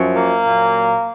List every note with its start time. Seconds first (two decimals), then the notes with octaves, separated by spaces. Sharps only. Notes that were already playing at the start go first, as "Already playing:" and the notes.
Already playing: F#2 F3
0.16 A#3
0.47 A#2 F#3